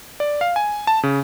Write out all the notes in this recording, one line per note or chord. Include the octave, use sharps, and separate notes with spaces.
D5
F5
G#5
A5
C#3